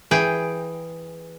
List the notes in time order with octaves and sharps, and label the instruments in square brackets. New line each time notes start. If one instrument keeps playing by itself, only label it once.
[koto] E3 G#4 G5